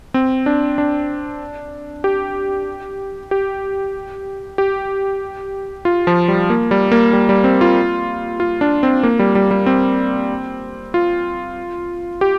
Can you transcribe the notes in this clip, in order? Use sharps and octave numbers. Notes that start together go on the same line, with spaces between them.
C4
D4
D4
G4
G4
G4
F4
F3
G3
A#3
G3
A#3
G3
G3
C4
F4
F4
D4
C4
A#3
G3
G3
G3
C4
F4
G4